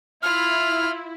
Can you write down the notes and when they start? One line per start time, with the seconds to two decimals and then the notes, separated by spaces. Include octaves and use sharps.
0.23 E4 F4 B5 F6